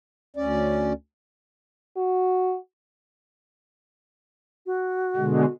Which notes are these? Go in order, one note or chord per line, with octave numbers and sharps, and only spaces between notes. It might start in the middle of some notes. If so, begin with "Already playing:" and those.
D2 C#4 D5
F#4
F#4
B2 D3 G#3